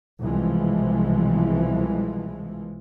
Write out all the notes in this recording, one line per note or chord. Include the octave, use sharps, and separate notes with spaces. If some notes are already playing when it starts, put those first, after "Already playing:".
C2 B2 E3 F3 G#3